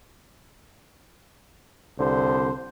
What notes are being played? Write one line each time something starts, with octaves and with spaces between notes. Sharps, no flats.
C2 D3 C5